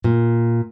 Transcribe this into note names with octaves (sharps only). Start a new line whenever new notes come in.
A#2